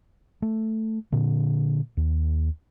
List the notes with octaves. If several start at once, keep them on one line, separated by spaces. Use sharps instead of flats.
A3
A#2 D3
D#2